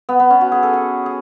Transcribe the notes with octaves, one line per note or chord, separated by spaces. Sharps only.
B3
B3
C#4
F#4
G#4
A4
G#4
G#4